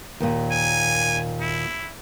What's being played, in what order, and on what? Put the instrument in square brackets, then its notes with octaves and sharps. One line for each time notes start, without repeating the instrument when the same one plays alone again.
[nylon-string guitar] D#2 A#2
[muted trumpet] G#5
E4